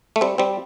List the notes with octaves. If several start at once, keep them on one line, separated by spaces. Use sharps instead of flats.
A3
G3 C4
G3 C4